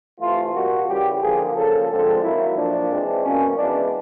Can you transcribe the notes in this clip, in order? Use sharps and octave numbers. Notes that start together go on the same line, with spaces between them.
C3 E3 A3 F4
A#2 G3 A#3 F#4
C#3 E3 G3 G4
D3 F3 A#3 G#4
C#3 F3 A#3 A4
D3 F3 G#3 C4 A4
D#3 F#3 A#3 E4
A#2 F3 A#3 D4
E3 G#3 C4
B2 F#3 A#3 C#4
E3 G#3 B3 D4